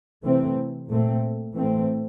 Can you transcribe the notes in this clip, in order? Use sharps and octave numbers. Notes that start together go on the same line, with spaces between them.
C3 E3 A3 C4
A#2 A3 C4
A2 E3 A3 C4